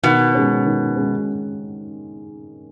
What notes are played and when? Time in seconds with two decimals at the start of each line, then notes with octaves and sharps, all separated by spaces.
0.03 B2 D#3
0.35 G#3 C#4
0.65 D#3
0.96 G#3 C#4